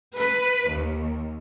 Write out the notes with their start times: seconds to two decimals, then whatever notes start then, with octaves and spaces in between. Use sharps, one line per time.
0.17 B4
0.70 D#2